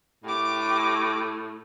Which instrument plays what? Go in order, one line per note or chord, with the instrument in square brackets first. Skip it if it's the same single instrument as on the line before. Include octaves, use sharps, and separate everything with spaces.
[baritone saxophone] A2 [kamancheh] G4 D6